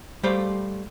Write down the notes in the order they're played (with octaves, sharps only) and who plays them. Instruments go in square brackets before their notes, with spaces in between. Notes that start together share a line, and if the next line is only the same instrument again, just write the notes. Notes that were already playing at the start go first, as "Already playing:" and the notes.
[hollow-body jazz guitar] G3 A3 G4 C5 F5